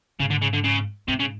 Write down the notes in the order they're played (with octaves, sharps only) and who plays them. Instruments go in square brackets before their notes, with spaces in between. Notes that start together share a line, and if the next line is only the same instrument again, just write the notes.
[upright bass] G#2 [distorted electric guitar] C#3
[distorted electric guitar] D3
C#3
D3
C#3
[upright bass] G#2 [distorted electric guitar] C3
[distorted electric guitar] C#3